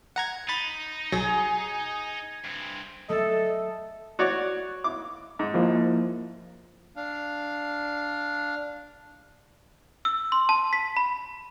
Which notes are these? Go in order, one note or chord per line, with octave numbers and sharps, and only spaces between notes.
F#5 A#5 G#6
D#4 B5 A6
B1 F#3 G#4 A#6
G2 C4
A3 A4 D#5
F#4 C#5 D5
D6
G#2
F3 A#3 E4
D4 F5
E6
C6
A5
B6
B5